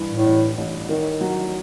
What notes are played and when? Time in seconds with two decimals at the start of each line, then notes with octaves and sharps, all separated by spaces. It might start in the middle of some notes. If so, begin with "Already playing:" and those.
Already playing: G2 E3
0.10 A2
0.25 A1
0.58 A1
0.89 D#3
1.21 F#3